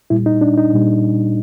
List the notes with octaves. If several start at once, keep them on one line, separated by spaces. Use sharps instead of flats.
A#2 G3 E4
D#4
D4
D#4
A#2 G3